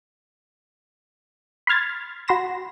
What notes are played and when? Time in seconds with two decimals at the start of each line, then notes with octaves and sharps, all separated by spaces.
1.67 B5 C6 F6 G#6 A6
2.28 F#4 B5 C6 A#6 E7